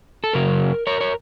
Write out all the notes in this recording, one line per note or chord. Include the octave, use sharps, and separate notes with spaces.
A4
F#2 C#3 F#3 A#4
A#4 C#5
C#5